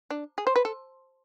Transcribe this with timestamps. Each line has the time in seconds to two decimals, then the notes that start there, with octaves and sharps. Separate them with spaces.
0.10 D4
0.38 G#4
0.47 C5
0.56 B4
0.65 A4